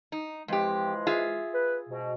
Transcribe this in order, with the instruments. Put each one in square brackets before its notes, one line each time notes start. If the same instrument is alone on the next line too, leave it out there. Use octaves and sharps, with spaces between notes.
[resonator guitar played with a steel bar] D#4
[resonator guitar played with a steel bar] F2 G4 [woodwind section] E3 F3 G#3
[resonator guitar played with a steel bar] F4 G#4 E5
[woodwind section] B4
G#2 B2